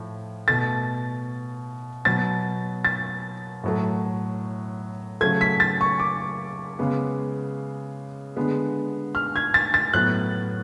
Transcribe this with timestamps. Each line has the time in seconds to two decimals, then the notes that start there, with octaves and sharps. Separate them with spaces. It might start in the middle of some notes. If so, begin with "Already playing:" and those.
Already playing: A2 F3
0.48 B2 A3 A6
2.05 B2 F#3 B3 A6
2.85 A6
3.64 A2 F#3 A3
5.21 C#3 F#3 A3 G#6
5.41 B6
5.60 A6
5.81 C#6
6.00 D6
6.79 C#3 G#3 B3
8.36 D3 G#3 B3
9.15 F6
9.36 G#6
9.54 A6
9.74 A6
9.93 A2 F#3 B3 F#6